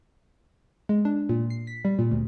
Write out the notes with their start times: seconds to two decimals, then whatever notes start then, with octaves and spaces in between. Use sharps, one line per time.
0.89 G#3
1.05 D4
1.29 A#2
1.50 C7
1.67 B6
1.85 G3
1.99 A#2
2.11 D2